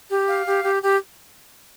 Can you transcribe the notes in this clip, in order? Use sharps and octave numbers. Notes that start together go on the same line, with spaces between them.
G4
F5
G4
G4
G4